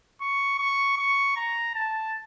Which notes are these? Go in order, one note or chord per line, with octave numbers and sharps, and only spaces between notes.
C#6
C#6
C#6
A#5
A5